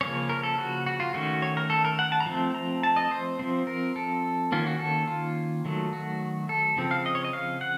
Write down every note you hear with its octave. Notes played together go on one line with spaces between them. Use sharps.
C#3 F3 A#3 C#4 C#5
A#4
A4
F#4
F#4
F4
D#3 A3 C#4 F#4
C#5
A#4
A4
A#4
F#5
A5
A#5
F3 A3 C4
A#5
A5
D#5
C5
F3 C4
A#4
A4
D#3 A#3 C#4 F4
F#4
A4
F4
D#3 F#3 A3
F#4
A4
C#3 F3 C4
F5
D#5
C#5
D#5
F5
F#5